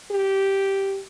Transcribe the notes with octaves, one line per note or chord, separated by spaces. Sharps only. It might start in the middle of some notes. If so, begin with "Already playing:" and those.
G4